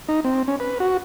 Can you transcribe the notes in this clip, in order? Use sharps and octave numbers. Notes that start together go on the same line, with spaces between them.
D#4
C4
C#4
B4
F#4